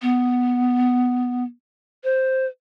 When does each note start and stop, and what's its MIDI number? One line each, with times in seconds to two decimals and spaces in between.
0.02 1.44 59
2.04 2.46 72